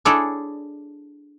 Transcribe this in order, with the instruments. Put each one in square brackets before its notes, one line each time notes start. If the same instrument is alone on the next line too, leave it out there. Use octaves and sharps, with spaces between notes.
[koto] D4 E4 G#4 A4 C#5 D5